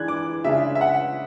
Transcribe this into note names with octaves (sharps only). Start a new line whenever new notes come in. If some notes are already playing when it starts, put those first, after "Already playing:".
Already playing: E3 G#3 D4 F#6 G#6
D6
C#3 G#3 D4 E5
E5
F#5